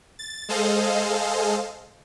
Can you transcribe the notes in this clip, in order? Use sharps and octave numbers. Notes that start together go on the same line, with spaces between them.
A6
G#3 G#4 A4 C5 D#5 F5